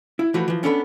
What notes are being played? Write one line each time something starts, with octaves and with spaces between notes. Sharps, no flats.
E4
E3 F3 A3 F#4 B4
E3 F3
B3 C#4 D4 A4 E5 B5